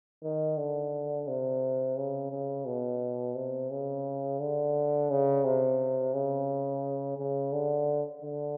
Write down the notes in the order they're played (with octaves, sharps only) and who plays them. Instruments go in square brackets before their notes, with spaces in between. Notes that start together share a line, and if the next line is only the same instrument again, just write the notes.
[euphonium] D#3
D3
C3
C#3
C#3
B2
C3
C#3
D3
C#3
C3
C#3
C#3
D3
D3